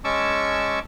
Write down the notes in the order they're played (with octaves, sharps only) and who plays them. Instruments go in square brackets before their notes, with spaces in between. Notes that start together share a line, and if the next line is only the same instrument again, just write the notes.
[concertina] G#3 C#4 A5 C#6 D6 E6